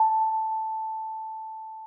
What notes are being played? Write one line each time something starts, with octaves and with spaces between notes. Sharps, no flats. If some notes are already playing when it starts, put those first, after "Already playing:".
Already playing: A5